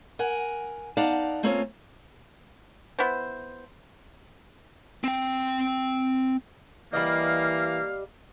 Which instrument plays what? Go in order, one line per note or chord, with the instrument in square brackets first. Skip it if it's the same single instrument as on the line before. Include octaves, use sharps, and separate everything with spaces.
[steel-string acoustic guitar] A#4 F#5 G#5
B3 D#4 D5 F5 F#5 A5
A3 A#3 C4 C#4 F4 C#5
[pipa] B3 E4 C5
[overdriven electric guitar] C4 G5
[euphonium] E3 [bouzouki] G3 D5 D#5 [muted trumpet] A#3 [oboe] F5